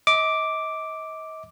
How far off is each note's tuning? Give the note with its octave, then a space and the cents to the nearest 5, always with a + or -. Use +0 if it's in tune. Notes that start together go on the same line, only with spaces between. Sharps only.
D#5 +40 D6 +0